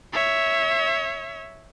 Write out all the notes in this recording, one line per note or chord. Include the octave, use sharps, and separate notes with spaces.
C#5 E5